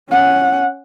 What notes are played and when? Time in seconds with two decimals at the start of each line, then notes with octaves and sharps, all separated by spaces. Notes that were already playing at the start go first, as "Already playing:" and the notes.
0.11 C#4 F#5